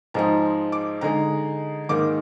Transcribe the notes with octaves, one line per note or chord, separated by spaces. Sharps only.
G#2 F3 G#3 D#4 A#5
D6
D3 G#3 D#4 A#5
G#2 D#3 A#3 D#4 D6